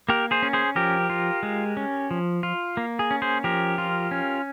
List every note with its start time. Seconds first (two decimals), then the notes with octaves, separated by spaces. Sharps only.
0.09 A#3 G4 A#4
0.31 G#4 C5
0.42 C#4
0.53 G#4 C5
0.76 F3 G4 A#4
1.10 F4
1.43 G#3
1.77 C#4
2.11 F3
2.43 F4
2.77 A#3
2.99 G#4
3.11 C#4
3.22 G#4 C5
3.44 F3 G4 A#4
3.78 F4
4.11 C#4